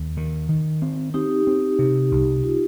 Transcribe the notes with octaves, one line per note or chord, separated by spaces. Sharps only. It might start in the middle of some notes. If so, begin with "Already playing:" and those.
Already playing: D#2
D#3
D#3
C4
C4 D#4 G4
C4
C3
C2
F4